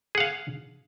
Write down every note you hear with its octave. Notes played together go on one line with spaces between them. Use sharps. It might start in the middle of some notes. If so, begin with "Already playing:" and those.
G#4 F5 F#5